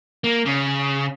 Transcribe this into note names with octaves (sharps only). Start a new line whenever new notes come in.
A#3
C#3